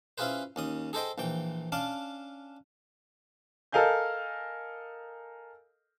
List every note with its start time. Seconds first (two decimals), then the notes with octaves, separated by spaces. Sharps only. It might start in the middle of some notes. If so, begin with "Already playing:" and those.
0.18 C#4 E4 F4 G#4 B4 C5
0.56 D#2 C#4 D#6
0.93 G#4 A4 C5 D#5 G5
1.18 A#1 E3 G5
1.72 C#4 D4 F5 A5 D6
3.72 A4 A#4 D#5 F5 G#5 G6